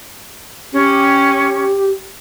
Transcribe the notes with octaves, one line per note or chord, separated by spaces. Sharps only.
C#4 G4